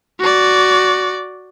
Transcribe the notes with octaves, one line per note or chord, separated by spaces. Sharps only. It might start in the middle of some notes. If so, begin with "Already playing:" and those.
F#4 D5